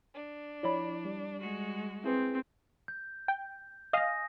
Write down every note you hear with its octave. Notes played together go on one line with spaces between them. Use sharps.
D4
F3 E4 C#5 D5 B5
G3
G#3 F#4
C4 E4 G#4 B4
G6
G5
D#5 F5 G#5 D#6 A#6